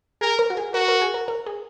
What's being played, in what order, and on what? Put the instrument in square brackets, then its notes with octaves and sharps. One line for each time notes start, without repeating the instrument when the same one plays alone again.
[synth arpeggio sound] G#4 [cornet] A#4
[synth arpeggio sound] A#4
F#4
G#4
[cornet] F#4 [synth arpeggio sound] A#4
[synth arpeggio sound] A#4
G#4
A#4
A#4
G#4